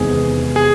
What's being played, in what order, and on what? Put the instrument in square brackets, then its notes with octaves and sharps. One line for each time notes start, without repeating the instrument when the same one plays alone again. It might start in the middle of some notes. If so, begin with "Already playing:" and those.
Already playing: [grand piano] E2 C3 D#3 G#3 B3 [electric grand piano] G#4
[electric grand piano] G#4